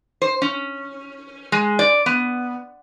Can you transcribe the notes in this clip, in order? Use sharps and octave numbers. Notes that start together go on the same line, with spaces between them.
C5
C#4
G#3
D5
B3